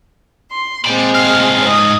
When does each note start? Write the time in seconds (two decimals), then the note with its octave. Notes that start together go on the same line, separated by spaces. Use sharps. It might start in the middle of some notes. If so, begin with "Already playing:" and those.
0.51 C6
0.85 A#2 G#3 C4 G5 B5
1.15 G#2 F5 F6
1.64 D#5 D#6